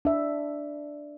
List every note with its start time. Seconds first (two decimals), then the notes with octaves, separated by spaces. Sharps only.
0.05 D4 E5